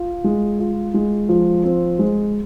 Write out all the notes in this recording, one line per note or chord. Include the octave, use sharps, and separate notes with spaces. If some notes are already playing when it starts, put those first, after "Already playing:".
Already playing: F4
G#3
F4
G#3
F3
C4
G#3